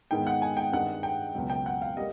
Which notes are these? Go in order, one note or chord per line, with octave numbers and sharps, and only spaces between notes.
G#2 D#3 G#3 B3 G5
F#5
G#5
G5
G2 D#3 G#3 C4 F#5
G5
C#2 B2 F#3
G5
F#5
F5
G3 A#3 D#5